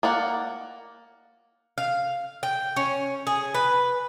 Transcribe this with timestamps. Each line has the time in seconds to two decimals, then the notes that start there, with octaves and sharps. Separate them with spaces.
0.03 A#3 D5 F#5
1.78 F5
2.43 G5
2.76 C#4
3.27 G#4
3.54 B4